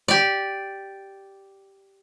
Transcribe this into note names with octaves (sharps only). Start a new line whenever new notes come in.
G4 D5